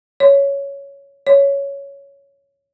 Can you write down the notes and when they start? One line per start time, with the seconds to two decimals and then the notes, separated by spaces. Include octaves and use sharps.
0.20 C#5
1.27 C#5